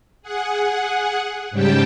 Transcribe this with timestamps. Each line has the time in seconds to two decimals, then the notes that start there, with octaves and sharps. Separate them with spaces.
0.22 G#4 F#5
1.51 G#2 C#3 G3 G4 G5 A5